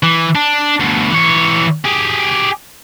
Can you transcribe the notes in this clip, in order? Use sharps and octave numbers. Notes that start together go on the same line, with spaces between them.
E3
D4
D2 B2
E3 C#5
G4 G#4